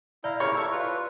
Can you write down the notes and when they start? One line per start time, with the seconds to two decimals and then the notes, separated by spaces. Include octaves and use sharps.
0.24 E4 D5 F5 A#5
0.40 E4 G4 A#4 C#5 D5
0.55 E4 A4 C#6
0.71 F4 B4